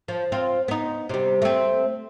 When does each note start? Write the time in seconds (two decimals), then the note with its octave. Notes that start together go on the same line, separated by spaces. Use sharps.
0.08 F3
0.32 C4 F4
0.68 B3 D#4
1.09 C3 G3
1.42 A3 C4